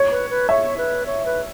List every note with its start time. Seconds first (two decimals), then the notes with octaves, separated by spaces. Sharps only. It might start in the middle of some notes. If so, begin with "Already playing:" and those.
Already playing: C#5
0.11 B4
0.30 B4
0.49 C#5 E5
0.78 B4
1.06 C#5
1.25 B4